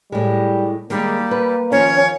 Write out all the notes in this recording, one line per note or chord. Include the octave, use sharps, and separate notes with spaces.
A2 G3 G#3
D#3 G3 G#3 A#3 D#4
B4
D#3 F3 C#4 F4 C#5